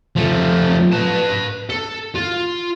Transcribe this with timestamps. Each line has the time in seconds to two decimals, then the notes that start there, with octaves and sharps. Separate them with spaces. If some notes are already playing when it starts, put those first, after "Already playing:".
0.16 F3 A3
0.92 B4 A5
1.69 A4
2.14 F4